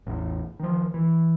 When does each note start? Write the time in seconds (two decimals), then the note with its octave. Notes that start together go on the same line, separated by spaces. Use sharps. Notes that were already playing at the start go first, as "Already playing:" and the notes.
0.07 A1 E2
0.59 D#3 F3
0.94 E3